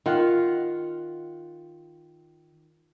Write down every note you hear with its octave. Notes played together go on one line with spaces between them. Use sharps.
D#3 F4 F#5